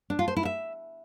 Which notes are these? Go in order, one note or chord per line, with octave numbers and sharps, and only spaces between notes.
D4
F4
C5
E4
E5